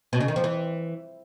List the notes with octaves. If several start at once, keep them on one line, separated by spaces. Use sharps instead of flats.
B2
C#3
D#3
F3
E3